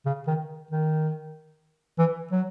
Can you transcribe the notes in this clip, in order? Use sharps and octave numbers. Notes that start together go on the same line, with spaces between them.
C#3
D#3
D#3
E3
F#3